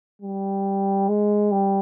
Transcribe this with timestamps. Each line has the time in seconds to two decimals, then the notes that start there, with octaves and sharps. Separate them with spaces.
0.22 G3
1.08 G#3
1.52 G3